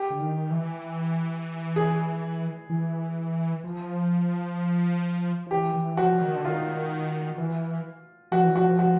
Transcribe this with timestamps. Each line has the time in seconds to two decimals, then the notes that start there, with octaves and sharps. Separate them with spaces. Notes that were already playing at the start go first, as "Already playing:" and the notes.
Already playing: G4
0.10 D3
0.20 D#3
0.51 E3
1.76 G#4
2.70 E3
3.64 F3
5.46 F3
5.51 E3 G4
5.74 E3
5.97 F3 F#4
6.22 D#3
6.36 D3
6.45 D#3 F4
7.38 E3
8.32 F3 F#4
8.44 E3
8.56 F3 F#4
8.79 F#4